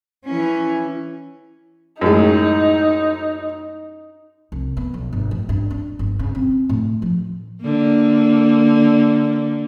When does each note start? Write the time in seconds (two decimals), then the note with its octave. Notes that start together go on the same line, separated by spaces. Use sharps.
0.25 E3 C#4
2.01 F#2 A2 G#3 D#4
4.52 C2
4.77 B3
4.94 B1
5.13 G1
5.31 A1
5.49 G2
5.70 D4
5.99 G1
6.19 C#3
6.35 C4
6.69 A2
7.02 F3
7.61 D3 A#3